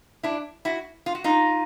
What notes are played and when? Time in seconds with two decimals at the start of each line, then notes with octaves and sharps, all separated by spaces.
0.23 D4 E4
0.65 E4 F#4
1.06 F4
1.15 F#4
1.24 D#4 F4